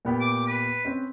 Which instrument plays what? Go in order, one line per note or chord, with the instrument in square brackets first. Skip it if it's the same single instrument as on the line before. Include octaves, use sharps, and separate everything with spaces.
[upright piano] A#2 B3 G4
[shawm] D6
B4
[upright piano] C4 C#4